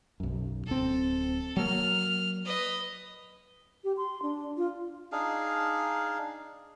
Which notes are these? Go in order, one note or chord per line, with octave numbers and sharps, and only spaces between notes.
B1 F#2
D1 C4 A4
F#3 A#3 F6
B4 D#5
G4
C6
D4
F4
D4 D#4 G#4 F5